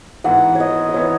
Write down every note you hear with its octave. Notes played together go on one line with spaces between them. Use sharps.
G#2 E3 B3 F#5
C#5
D#5
D#5
E3 B3 C#5